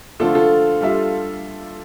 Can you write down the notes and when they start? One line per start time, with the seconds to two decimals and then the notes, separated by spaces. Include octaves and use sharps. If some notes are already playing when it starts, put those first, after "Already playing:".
0.19 D3 F3 A3 D4 F4 A4
0.35 F4 A4
0.81 G3 D4 F4 A4 E5